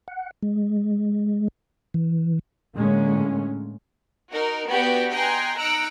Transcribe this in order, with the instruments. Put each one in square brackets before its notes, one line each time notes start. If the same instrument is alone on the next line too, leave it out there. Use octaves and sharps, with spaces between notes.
[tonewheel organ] F#5
G#3
E3
[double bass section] A2 D3 G#3 A#3 C#4
[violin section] D#4 F#4 A#4
B3 D4 F#4 G4 B4 G5
D#5 G5 G#5 A#5 C6 F#6
D#4 A#5 E6 F#6 C#7 D7